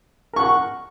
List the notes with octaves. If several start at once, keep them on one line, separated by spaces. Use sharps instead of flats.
A#4 F#5 C#6